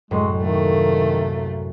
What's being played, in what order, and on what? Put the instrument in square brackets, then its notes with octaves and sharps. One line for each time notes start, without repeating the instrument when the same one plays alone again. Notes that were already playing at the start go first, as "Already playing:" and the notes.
[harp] C2 F#2 A2 [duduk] G#3
[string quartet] C3 A3 A#3 [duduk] D#3